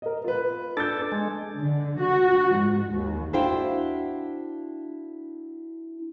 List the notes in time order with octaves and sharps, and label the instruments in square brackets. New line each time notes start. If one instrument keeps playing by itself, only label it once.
[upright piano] A#4 D#5
F4 B4
[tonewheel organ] D4 A4 [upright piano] G6 A6
[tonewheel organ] G#3
[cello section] D3
F#4
G#2
D#2
[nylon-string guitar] D4 E4 F#4 C5 F5 G5